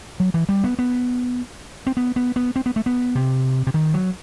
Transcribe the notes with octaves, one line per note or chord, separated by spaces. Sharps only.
F#3
E3
G3
B3
B3
C4
B3
B3
B3
C4
B3
A3
B3
C3
C3
D#3
F#3